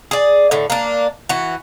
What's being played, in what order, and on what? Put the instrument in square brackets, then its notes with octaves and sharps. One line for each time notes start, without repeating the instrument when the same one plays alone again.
[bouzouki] G#4 D5
A2 D3
A#3 D4
E3 F#4